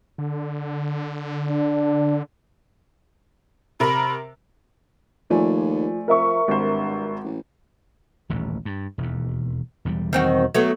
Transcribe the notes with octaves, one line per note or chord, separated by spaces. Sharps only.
D3
D4
C3 A#4 B5
D#2 F3 A3 D5 G#5
F3 A#4 E5 C#6
G#1 G2 C5
A1
D#1 A1 D#2
G2
E1 D#2
E1 E2 G3
D#3 C4 F#4
F#3 A3 B3